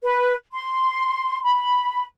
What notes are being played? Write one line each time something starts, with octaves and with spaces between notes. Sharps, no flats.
B4
C6
B5